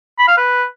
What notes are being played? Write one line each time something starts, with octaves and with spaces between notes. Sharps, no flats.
B5
F5
B4